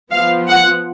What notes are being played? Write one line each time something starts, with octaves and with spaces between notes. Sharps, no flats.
F3 B3 F5
F#5